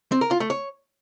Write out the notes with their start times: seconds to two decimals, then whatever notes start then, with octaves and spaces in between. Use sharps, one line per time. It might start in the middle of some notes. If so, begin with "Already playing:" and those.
0.12 C4
0.21 A#4
0.31 F4
0.40 A3
0.50 C#5